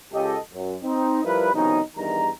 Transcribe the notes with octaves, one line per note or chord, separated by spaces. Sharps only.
C#2 G4 A4 D#5
F#2
C4 D#4
F3 G3 E4 A#4 B4
C2 B2 D#3 F3 C#4 D#4
E2 G2 D#3 D#4 A#5